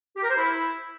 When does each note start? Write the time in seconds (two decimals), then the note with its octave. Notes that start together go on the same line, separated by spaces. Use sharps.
0.16 G4
0.23 A#4
0.30 C5
0.37 E4